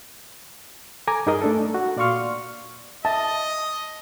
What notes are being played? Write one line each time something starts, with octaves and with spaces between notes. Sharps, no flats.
A4 G#5 A#5 D6
G2 D#4 G#4 A#4 D#5
A3 D4 A4
F#4
A#2 D5 F5 C6 C#6 F6
D#5 E5 A5